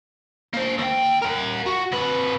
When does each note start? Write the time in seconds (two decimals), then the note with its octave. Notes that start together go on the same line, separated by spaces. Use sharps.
0.54 A#3 C5
0.78 D#2 G5
1.22 A#4 F#5
1.66 F#4
1.92 C3 B4